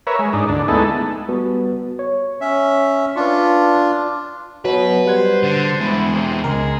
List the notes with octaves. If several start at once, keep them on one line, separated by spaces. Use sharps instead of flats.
A#4 B4 C#5 E5
G#3
G#2 D4 D#4
D2 D4
G#3 A3 B3 D#4 E4 A4
G3 B3 F#4
C#5
C#4 E5
D4 F4 B4 C#6
B2 F#3 B3 B4
G3 C5 F#5 G#6
D3
E2 G#3 E4
C3
C#2 G#3 A#4